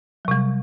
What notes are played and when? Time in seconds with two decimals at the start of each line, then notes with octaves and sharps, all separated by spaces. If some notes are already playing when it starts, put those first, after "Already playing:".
0.25 F#3
0.28 C3
0.31 G3